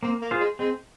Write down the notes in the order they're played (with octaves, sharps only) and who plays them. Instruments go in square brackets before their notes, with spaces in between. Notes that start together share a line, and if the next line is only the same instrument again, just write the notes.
[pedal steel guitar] A#3 [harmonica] C4
[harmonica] A#3
[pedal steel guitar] F4 G#4 C5
[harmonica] G#3
[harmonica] G#3 [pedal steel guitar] C4